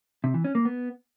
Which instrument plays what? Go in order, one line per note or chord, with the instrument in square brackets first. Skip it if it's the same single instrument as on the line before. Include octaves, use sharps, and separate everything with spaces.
[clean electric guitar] C3
E3
C#4
A#3
B3